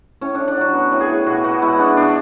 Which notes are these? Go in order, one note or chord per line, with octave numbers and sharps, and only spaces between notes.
A2 C#4
A2 D4
D4
F#3 F#4
B3
A2
G#4
A2
B2 F#4
B2 F#4
G#3 E4
B3 D4
B2 D4